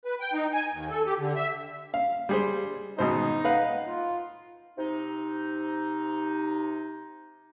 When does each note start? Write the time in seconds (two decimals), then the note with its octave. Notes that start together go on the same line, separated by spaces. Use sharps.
0.05 B4
0.20 G5
0.33 D#4
0.53 G#5
0.72 D#2
0.90 A4
1.06 G4
1.19 D3
1.36 E5
1.94 F5
2.29 G3 G#4 C5
2.99 G#1 B2 D#4 C5
3.45 B4 F5 F#5
3.87 F4
4.78 C3 D#4